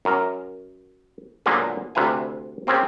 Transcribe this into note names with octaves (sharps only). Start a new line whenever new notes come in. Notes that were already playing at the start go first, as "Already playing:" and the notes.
F#2 A#4
A#2 D3 F#3 G#3 A#3 B3
D2 C3 B4 F5 G#5
A#3 C4 C#4 G4 G#4